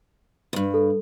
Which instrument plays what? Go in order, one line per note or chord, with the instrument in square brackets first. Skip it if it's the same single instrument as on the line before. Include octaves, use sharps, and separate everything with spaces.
[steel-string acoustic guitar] E2 G2
[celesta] A4